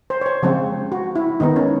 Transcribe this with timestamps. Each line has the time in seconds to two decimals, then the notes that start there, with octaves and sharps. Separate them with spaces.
0.10 C5
0.21 C#5
0.26 C5
0.43 C#3 F3 G#3 C4
0.92 F#4
1.16 E4
1.40 D#3 G#3 B3 D#4
1.56 C#4